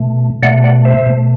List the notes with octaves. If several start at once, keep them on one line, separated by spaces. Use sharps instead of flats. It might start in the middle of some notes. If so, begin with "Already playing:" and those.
Already playing: B2 A3
B2 A3 D5 F#5
D5 F#5
C5 E5
B2 A3